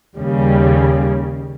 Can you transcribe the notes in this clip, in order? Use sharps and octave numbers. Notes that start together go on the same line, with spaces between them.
D#2 C#3 G3